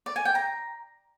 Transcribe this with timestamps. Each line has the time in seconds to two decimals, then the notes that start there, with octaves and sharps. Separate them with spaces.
0.06 D5
0.16 G#5
0.25 G5
0.35 A#5